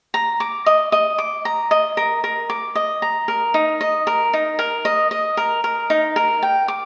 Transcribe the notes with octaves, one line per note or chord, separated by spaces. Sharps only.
A#5
D6
D#5
D#5
D6
A#5
D#5
A#4
A#4
D6
D#5
A#5
A#4
D#4
D#5
A#4
D#4
A#4
D#5
D#5
A#4
A#4
D#4
A#4
G5
D6